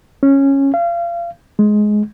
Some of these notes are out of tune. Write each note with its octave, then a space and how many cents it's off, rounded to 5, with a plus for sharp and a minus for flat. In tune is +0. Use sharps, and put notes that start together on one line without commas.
C#4 -10
F5 -30
G#3 +15